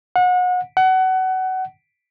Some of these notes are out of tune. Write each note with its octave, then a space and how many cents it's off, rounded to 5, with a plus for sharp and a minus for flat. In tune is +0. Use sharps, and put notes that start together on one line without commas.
F#5 -30
F#5 +25